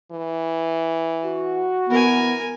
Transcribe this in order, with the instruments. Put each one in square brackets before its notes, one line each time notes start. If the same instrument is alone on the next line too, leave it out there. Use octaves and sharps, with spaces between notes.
[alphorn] E3
[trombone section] F#4
[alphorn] E3 [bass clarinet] B3 [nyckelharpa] A#4 G#5